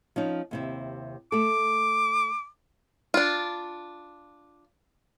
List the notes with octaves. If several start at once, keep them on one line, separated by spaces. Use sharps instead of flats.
F3 C#4 D#4
D#2 C3 E4
A3 A4 D6
D4 F4